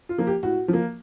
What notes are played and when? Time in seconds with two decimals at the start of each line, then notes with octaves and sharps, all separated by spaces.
0.09 F4
0.18 F3 A#3
0.27 G4
0.43 A2 F#4
0.68 F3 A#3